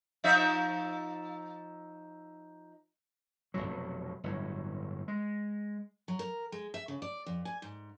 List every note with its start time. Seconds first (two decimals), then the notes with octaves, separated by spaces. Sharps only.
0.24 F3 D#4 E5
3.54 F1 C2 B2 F#3
4.24 G1 A2 F#3
5.08 G#3
6.08 F#3
6.19 A#4
6.52 G#3
6.74 E5
6.88 C#3
7.02 D5
7.26 F2
7.45 G#5
7.62 G#2